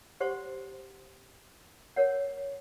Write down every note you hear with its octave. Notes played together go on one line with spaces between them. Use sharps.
G4 C5 F#5 C6 C#6
A#4 C#5 F#5